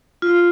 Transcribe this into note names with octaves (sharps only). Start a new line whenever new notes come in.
F4